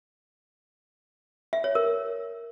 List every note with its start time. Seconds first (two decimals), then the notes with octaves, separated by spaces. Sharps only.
1.53 E5
1.64 C#5
1.75 A#4